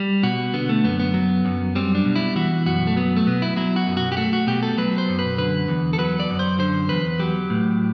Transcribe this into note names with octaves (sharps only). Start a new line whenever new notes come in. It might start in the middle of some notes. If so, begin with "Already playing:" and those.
Already playing: G3
B2 F#4
D3 B3
A3
F#2 B3
B3
F#3
F#2
G3 C4
D4
B2
E4
E3 F#4
F#2 F#4
A3
F#3 B3
A3
B2 B3
E4
F#3 E4
F#4
F#2
F#4
G4
A3 F#4
F#4
B2 G4
A4
F#3 B4
C5
F#2
B4
D3 B4
E2
A4
F#3 B4
D5
F#2
C5
D3 C5
E2 B4
F#3 G4
A2